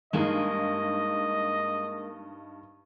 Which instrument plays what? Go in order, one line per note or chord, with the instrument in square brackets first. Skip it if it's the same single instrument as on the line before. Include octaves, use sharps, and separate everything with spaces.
[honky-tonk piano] G2 D#4 [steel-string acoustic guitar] G#3 A#3 G#4 [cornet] D#5